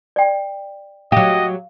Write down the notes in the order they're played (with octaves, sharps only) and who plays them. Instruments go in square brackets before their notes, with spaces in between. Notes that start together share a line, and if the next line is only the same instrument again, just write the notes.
[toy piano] D5 G5
[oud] F#3 G4 [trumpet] D#5 [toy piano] F5